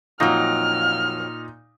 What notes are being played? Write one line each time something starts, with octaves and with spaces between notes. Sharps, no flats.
F2 A#2 F#3 D#4 F6 A#6